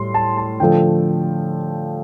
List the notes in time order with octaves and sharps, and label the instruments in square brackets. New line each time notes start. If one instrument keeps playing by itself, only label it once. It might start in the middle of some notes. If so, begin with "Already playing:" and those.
Already playing: [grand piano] A2 G3 C6
A5
A5
D3 F3 A3 G5